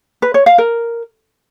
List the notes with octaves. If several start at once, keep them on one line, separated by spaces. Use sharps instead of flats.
B4
C#5
F5
A#4